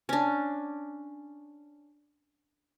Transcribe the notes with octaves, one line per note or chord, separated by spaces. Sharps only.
C#4 D4